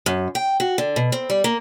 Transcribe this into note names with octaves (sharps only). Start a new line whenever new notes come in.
F#2
G5
F#4
D3
B2
C4
G3
A#3